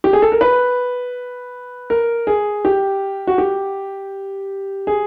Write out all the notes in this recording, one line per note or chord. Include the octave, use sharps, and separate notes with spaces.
G4
G#4
A4
A#4
B4
A#4
G#4
G4
F#4
G4
G#4